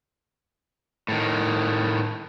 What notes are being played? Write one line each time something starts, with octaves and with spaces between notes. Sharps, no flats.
A2 D#3